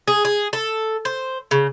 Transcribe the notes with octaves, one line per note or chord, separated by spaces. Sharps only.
G#4
G#4
A4
C5
C#3